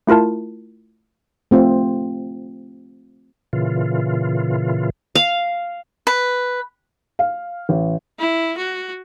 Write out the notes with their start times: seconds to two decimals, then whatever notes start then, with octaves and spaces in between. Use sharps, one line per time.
0.07 A3 E4 F4 A#4 A5
1.51 A3 C4 F4
3.53 A#2 C#3 E3 F4
5.15 F5
6.07 B4
7.19 F5
7.69 A1
8.19 E4
8.57 F#4